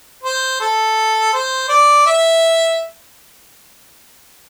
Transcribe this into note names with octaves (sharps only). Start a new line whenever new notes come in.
C5
A4
C5
D5
E5